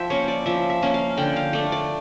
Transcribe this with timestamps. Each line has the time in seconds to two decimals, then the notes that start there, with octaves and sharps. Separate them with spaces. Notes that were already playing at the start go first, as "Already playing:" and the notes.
Already playing: F3 E5 G5
0.10 A#3 C#4 C#5
0.28 D5
0.46 F3 E5
0.70 E5
0.82 A#3 C#4
0.94 F5
1.17 D3 G5
1.36 F5
1.53 A3 D4
1.72 D5